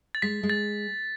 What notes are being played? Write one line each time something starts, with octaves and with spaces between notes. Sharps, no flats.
A6
G#3 B6
G#3
A6